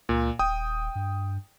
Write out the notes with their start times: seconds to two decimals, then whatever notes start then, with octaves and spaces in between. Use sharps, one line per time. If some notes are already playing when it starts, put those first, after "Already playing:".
0.09 C#2 A#2
0.39 D#1 G5 D#6
0.95 G2